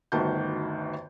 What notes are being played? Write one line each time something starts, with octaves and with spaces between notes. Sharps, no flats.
G1 D2 D#3 F#4 A5 G6